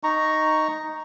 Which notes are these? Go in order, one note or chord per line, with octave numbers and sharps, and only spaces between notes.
D#4 A#5 C#6